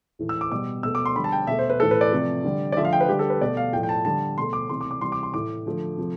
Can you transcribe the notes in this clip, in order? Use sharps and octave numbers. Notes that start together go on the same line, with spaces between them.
A2 E3 A3
E6
D6
B2 G3 D6
B2 A3 E6
D6
C6
D3 G3 B5
A5
G5
B2 A3 E5
C5
B4
A2 E3 A3 A4
B4
D5
C3 F3 A3
D3 G3
D5
D3 F3 A3 E5
F5
G5
B4
D3 G3 G4
A4
B4
B2 A3 D5
F5
A2 F3 A3 G5
G5
A5
D3 G3 A5
B2 A3 C6
D6
C3 E3 A3 C6
D6
D6
C3 E3 G3 C6
D6
C6
A2 E3 A3 D6
D3 F3 A3
C3 F3 A3